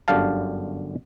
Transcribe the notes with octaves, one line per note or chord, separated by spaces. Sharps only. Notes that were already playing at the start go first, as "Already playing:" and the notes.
G1 F#2 D3 G4 F5 A5